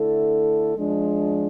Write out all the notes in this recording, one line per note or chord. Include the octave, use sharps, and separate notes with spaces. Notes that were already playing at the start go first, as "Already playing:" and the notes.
Already playing: D3 A3 E4 A4
F3 G#3 D4